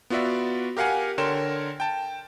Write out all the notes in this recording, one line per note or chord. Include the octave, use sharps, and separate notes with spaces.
B3 F4 F#4 D5 E5
G4 A#4 F5 F#5 G#5
D3 A#4 C#5 G5 C6 E7
G5 A5